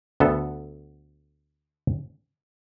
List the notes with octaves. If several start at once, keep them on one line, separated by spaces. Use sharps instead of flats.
D2 B3 A4